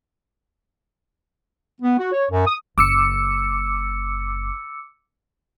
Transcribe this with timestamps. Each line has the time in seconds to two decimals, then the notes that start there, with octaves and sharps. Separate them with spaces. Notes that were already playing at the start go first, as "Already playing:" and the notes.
1.81 B3
1.98 F#4
2.12 C#5
2.30 F#2
2.46 D#6
2.78 F#1 D6 E6 C#7